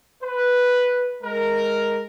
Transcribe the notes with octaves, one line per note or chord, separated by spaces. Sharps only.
B4
G#3 A#4